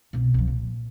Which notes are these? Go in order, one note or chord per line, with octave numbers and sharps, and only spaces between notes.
C2 B2
C2 F3
A#2